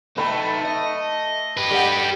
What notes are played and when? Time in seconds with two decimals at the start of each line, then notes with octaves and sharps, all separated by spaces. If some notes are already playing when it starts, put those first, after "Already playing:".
0.18 A3 D#4 B4 G5 A#5 B5
0.65 D#5
1.57 G4 B4
1.71 G3 A4 F#5